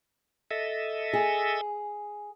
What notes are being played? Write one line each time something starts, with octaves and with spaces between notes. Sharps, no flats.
A4 D#5 E5
G#4